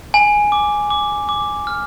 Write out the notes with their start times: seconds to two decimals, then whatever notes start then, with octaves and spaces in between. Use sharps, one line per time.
0.14 G#5
0.52 D6
0.90 D6
1.29 D6
1.67 F6